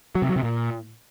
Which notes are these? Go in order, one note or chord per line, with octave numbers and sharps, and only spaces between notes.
F#3
C3
F#3
C3
A#2